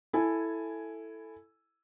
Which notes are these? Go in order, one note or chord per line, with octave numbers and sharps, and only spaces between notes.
E4 A4 G#5